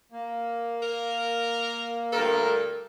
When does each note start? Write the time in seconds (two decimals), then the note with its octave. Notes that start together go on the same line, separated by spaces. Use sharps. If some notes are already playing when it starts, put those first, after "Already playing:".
0.12 A#3
0.83 A#4
2.12 D2 G2 A4 A#4